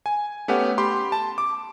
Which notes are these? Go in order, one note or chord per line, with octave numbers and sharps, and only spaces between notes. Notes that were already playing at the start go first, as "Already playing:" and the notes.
G#5
A3 B3 C#4 G4 F#5
G4 B5 C6
A5
D6